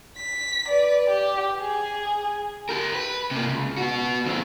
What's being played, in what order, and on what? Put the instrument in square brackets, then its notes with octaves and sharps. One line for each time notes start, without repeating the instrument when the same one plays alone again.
[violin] B6
B4 D5
G4
G#4
[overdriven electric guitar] G4 A#4
B4
C3 A#3
C#2
B3 F#4
D#2 C4